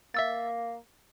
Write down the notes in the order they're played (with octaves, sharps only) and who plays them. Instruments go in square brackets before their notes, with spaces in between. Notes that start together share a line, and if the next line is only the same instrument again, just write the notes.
[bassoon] A#3 [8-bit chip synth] E5 E6 A6